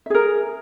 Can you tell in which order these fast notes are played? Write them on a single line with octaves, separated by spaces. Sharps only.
E5 G#4 A#4